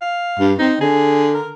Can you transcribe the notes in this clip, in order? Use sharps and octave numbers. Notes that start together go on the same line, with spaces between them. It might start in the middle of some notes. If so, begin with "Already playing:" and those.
F5
G2
C4 D#4
D3 G#4
A#4